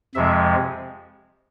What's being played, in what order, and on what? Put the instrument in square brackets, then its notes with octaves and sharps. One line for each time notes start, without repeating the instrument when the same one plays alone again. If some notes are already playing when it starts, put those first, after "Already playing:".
[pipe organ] F2 C3 F3 G#3 E5